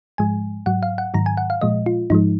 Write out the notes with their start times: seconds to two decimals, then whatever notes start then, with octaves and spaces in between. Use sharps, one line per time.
0.18 G#2 F3 G#3 G#5
0.66 G#2 F#3 F#5
0.83 F5
0.98 F#5
1.14 G#2 D#3 F#3 A#5
1.26 G#5
1.37 F#5
1.50 F5
1.61 A#2 F3 G#3 D#5
1.86 F4
2.10 G#2 F3 G#3 D#4